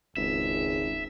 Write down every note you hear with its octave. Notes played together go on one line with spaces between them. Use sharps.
D#1 G#1 C#2 E5